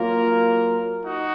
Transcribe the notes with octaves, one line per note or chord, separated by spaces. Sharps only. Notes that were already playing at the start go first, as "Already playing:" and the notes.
Already playing: F#3 A#3 F4 A#4
D#4 F#4